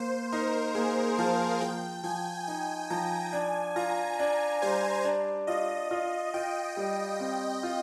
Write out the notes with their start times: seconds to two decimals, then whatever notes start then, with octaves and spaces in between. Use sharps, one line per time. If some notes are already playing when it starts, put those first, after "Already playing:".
Already playing: A#3 C5
0.32 D#4 A#4
0.75 A#3 G#4
1.18 F3 F5
1.61 F3 G5
2.03 F3 G#5
2.47 D#4 G#5
2.90 F3 A#5
3.33 D4 G#5
3.76 F4 A#5
4.19 D4 G#5
4.62 G3 C5
5.04 D4
5.47 F4 D#5
5.91 F4
6.34 F4 G5
6.77 G3
7.20 C4
7.63 F4